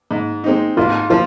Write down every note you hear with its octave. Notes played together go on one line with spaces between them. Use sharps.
G#2
G#3 C4 D#4
G#2 F4
F3 F4